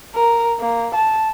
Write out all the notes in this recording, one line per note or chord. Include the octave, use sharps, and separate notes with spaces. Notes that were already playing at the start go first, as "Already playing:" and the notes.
A#4
A#3
A5